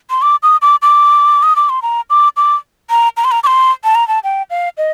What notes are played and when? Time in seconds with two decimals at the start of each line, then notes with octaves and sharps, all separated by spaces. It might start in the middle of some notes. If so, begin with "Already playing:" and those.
0.10 C6
0.22 D6
0.43 D#6
0.62 D6
0.82 D6
1.43 D#6
1.56 D6
1.69 C6
1.82 A#5
2.10 D6
2.37 D6
2.90 A#5
3.17 A#5
3.24 C6
3.31 A#5
3.44 D6
3.47 C6
3.84 A5
3.95 A#5
4.08 A5
4.24 G5
4.50 F5
4.78 D#5